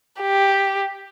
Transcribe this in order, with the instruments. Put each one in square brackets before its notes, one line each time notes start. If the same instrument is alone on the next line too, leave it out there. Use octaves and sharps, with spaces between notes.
[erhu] G4